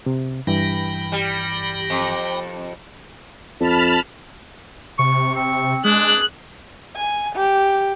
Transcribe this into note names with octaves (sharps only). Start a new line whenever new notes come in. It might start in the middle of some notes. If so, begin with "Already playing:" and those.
C3
G2 E3 G5 B5 A#6
G3
F2
F2 A5 B5 F6
C3 C#6
C4 C#6
G#3 D4 G#4 F#6
G#5
G4